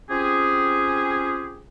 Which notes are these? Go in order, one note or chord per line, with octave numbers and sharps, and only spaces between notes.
C4 C#4 F4 G4 G#4